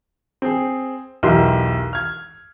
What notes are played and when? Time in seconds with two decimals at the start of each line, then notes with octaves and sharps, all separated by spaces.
0.42 C4 G#4
1.23 B1 E2 E4 G4 A#4 C6
1.93 F6 G#6